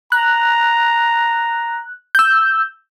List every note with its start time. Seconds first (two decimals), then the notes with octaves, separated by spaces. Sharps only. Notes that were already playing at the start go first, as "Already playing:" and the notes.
0.12 A#5 F#6
2.15 E6 G6